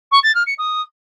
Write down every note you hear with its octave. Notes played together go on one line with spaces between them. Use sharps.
C#6
A6
F6
C#7
D#6